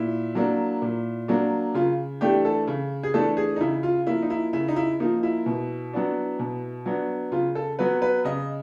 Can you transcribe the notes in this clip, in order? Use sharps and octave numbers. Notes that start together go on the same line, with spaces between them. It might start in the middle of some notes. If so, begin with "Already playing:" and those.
Already playing: A#2 E4
F#3 A#3 D4
A#2
F#3 A#3 D4
C#3 F4
E3 A3 D4 G4
A4
C#3
G#4
E3 A3 D4 A4
G#4
D#4
C#3 E4
F4
F3 A#3 E4
D#4
E4
C#3 E4
D#4
E4
F3 A#3 D#4
E4
B2
F#3 B3 D4
B2
F#3 B3 D4
C#3 F4
A4
F#3 B3 B4
B4
C#3 D#5